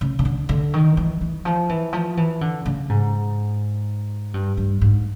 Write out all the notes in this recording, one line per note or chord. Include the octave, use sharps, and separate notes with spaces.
C#3
C#3
D3
D3
D#3
E3
E3
F3
E3
F3
E3
D3
C#3
G#2
G2
G2
G#2